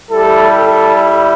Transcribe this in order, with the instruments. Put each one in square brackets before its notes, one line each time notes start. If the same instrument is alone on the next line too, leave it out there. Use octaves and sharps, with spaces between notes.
[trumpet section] G3 E4 G4 A4
A4